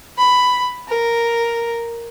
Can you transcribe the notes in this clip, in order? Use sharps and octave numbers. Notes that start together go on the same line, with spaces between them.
B5
A#4